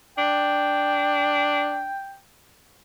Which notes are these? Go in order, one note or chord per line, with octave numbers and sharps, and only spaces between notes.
D4 G5